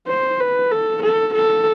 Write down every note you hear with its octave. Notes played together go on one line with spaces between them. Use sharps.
C5
B4
A4
A4
A4